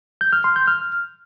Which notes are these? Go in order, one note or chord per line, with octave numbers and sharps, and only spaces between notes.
G6
F6
C6
G6
F6